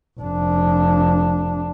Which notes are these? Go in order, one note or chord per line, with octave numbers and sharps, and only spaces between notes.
F1 D4